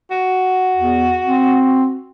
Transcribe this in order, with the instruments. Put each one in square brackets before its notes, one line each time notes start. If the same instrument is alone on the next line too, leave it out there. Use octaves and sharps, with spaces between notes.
[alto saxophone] F#4
[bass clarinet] E2
C4